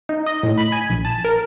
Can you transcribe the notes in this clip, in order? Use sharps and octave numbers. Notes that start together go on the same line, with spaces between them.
D#4
D#5
A2
B5
G#5
A#1
A5
A#4